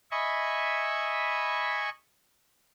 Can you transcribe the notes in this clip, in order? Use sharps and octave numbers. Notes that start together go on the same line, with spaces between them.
D#5 E5 G#5 B5 C#6